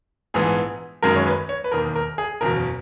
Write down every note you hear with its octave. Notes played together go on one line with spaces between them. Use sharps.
A#1 G#2 E3 B3 G#4
F#1 F#2 D#3 G#3 A#4
C#5
B4
C#5
B4
E1 D#2 D#3 A#4
A#4
G#4
F#1 E2 B2 A#4